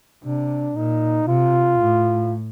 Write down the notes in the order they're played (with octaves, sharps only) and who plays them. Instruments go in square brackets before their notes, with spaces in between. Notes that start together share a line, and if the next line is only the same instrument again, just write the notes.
[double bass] C3 [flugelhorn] D4
[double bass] A#2 [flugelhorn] D#4
[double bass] C3 [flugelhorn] F4
[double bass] A2